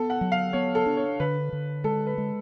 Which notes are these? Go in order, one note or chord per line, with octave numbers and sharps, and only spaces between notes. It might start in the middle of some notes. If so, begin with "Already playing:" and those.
Already playing: B3 A4
F#5
F#3
F5
B3 C#5
A4
D4
C#5
D3 B4
D3
G#3 A4
B4
G#3